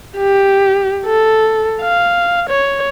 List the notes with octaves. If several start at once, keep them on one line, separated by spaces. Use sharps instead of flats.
G4
A4
F5
C#5